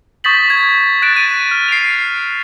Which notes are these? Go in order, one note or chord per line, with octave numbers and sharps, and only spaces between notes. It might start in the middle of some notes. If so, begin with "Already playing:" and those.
C#6 D#6 G6 A6 B6 F#7
G#6
C#6 F#6 A6 D7 E7
D#7
F6
C7 D7 D#7 F7